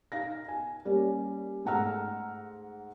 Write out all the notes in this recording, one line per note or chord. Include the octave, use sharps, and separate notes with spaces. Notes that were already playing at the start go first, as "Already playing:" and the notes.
D#4 F5 A#6
G#5
G3 A#3 C#4
G#2 A3 F#5 A#5 E6 F6